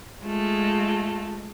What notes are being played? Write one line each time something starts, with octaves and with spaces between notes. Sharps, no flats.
G#3 A3 F4